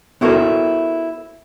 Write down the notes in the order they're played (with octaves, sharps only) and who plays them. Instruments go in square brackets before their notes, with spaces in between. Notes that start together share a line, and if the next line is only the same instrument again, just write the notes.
[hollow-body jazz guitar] B3 E4 F#4 A4 A#4 C5